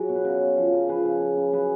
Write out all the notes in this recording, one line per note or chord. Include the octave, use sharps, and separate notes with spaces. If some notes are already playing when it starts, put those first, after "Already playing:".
Already playing: F#3 F#4 G#4
B2
B4
C#3 A#4 C#5
C#3
F3
C#3
F3 G#4 B4
C#3
C#3
C#3
F#3 G#4 B4